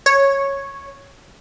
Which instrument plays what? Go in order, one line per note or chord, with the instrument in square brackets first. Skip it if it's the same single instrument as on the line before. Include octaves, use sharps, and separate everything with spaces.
[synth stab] C#5